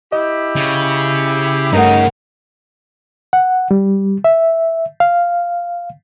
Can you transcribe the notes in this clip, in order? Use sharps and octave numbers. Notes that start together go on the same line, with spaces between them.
E4 G4 D#5
C#3
G2 C#3 A3 D#4 A#4 F#5
F#5
G3
E5
F5